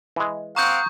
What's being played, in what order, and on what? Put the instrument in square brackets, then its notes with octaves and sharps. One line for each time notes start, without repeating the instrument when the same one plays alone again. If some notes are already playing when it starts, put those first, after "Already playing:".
[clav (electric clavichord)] E3 G#3
[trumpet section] C4 F5 F#5 [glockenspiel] A#5 D#6 G6 [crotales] C#6